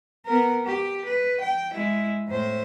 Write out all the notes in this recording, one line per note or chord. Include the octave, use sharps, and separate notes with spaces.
B3 A#4
G4
B4
G5
G#3 E4
A2 C5